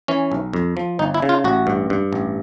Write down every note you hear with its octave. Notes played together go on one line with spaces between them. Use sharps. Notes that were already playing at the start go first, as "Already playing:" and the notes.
E3 C#4
B1
F2
F3
G1 D#4
E4
C#3
F4
A1 F#4
G2
G2
A1